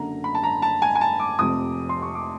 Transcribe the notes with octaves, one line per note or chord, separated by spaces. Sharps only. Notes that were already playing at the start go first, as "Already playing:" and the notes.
Already playing: F#1 F#2 D3 A#5
B5
A5
A#5
A5
G#5
G#5
A5
D6
F1 F2 C3 D#6
C6
C#6
D6